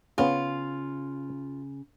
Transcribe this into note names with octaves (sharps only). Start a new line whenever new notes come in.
C#3 B3 C#4 F4 G#4